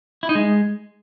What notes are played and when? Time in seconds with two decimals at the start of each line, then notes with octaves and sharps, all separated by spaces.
0.23 E4
0.29 D#4
0.35 G#3